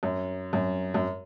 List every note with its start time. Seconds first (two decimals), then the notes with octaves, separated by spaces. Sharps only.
0.03 F#2
0.53 F#2
0.94 F#2